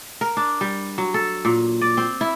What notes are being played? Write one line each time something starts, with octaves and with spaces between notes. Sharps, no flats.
A#4
D4
G3
F#3
A4
A#2
D5
C4
E4